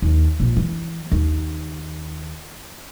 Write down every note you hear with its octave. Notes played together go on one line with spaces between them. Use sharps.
D#2
A#1
E3
D#2